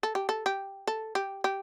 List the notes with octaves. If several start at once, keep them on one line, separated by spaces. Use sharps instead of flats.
A4
G4
A4
G4
A4
G4
G4